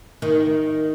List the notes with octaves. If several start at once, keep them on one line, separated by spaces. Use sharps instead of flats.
D#3